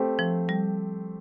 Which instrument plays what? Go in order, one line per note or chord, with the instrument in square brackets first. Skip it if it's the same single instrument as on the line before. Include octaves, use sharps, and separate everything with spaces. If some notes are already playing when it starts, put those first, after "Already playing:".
Already playing: [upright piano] A3 C4 G4 C5
[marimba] F3
G3